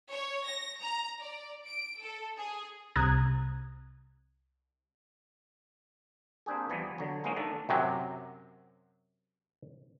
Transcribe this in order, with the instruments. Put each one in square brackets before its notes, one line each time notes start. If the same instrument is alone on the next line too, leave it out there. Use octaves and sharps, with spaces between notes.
[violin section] C#5
A#6
A#5
D5
D7
A4
G#4
[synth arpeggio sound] C2 C3 A#5 D#6 F#6 G#6
[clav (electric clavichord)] A#3 C4 D4 G4 G#4
E2 E3 F3 G3 B3
D3 F#3
F#3 G#3 A#3 B3 C#4 D#4
D#3 A3 D4 A4
F#2 C3 F#3